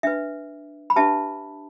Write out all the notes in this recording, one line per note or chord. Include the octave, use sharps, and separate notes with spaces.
D4 B4 E5
B5
D4 G4 B4 E5 A5